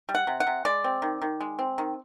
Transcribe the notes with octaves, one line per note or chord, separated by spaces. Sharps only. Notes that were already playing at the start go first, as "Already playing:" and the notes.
G3
F#5
C3
F#5
C3
G#3 D5
C4
D#3
D#3
G#3
C4
D#3